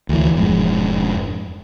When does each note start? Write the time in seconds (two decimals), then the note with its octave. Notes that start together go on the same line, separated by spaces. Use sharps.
0.09 D2 E3
0.35 E1 F2 G#2